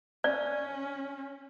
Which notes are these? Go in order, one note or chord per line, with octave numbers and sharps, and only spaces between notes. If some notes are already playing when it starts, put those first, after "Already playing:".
C#4 D5